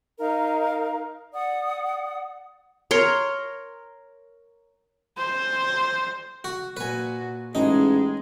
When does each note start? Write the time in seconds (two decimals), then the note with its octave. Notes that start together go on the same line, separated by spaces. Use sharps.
0.18 D#4 A#4 F5
1.33 D5 F#5 D#6
2.91 A#4 C#5 C6
5.18 C5
6.44 F#4
6.77 A#2 F#4 B4 G#5
7.55 A1 G#3 D#4 G#4